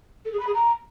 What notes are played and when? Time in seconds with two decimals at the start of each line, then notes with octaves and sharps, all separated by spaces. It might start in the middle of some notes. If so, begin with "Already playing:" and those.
0.25 A4
0.32 G#4
0.39 B5
0.46 G#4
0.54 A#5